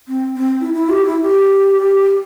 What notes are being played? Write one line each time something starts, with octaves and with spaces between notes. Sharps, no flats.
C4
C4
E4
E4
G4
E4
G4